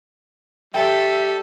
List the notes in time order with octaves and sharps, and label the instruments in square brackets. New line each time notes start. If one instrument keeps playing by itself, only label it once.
[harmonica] G3 [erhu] A4 [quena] E5 [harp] G5